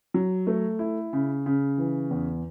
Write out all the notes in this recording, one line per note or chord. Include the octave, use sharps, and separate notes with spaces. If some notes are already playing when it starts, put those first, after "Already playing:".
F#3
A3
E4
C#3
C#3
E3
E2